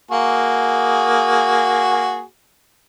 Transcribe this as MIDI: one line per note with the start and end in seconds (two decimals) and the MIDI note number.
0.11 2.22 58
0.11 2.22 66
0.11 2.22 68